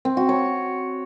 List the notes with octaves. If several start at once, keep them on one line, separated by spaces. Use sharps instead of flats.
C4
F#4
C#5